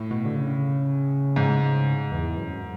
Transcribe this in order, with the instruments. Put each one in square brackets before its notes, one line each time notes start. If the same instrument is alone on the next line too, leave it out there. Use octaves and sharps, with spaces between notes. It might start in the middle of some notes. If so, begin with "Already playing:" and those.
Already playing: [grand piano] A2
[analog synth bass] B2
D3
C#3
[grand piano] G#2
[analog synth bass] E2
F#2